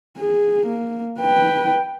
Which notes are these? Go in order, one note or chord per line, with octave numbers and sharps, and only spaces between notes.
G#4
A#3
B4 G5